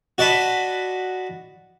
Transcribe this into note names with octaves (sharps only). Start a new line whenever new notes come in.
F#4 D5 D#5 A5 B5